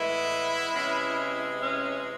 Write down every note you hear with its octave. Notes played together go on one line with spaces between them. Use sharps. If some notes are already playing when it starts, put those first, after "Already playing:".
Already playing: A2 E3 G#3 B3 E4
C3 E3 G#3 C#4
C#4